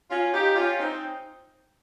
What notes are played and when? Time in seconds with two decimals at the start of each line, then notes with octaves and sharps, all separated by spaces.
0.11 C#4 F4
0.34 D#4 G4
0.56 C#4 F4
0.79 C4 D#4